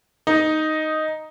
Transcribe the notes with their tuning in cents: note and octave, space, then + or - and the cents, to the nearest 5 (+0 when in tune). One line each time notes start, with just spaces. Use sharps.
D#4 +0 D#5 +0